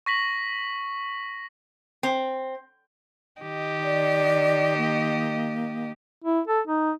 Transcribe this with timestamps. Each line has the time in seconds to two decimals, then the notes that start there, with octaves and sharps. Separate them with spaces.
0.06 C#6 A#6 B6 F#7
2.03 C4
3.41 D#3 G4 D#5
3.84 D5
4.78 A#3
6.25 E4
6.48 A4
6.68 D#4